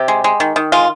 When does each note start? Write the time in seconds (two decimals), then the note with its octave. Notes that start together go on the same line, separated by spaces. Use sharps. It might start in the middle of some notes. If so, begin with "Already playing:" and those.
Already playing: C3 G4
0.08 G#3
0.24 G#3
0.40 D#3
0.56 D#3
0.72 G#3 F4